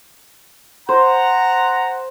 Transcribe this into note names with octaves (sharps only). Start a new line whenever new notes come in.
C5 F#5 A#5